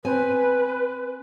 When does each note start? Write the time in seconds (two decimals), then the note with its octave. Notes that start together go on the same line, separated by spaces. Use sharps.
0.05 C4 B4 G#5